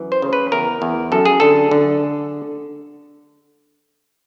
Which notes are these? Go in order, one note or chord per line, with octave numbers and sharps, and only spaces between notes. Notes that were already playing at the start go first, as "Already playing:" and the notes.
Already playing: F#2 E3
C5
C#3
B4
E2 A#4
E2
F#2 A4
G#4
D3 A4
D3